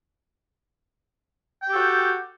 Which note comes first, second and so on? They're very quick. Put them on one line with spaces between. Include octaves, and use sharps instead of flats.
G5 G4 A4 F#4